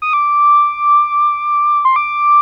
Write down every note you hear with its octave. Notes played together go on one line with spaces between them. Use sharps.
D#6
D6
C6
D6